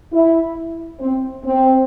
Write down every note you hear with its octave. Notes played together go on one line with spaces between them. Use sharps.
E4
C4
C4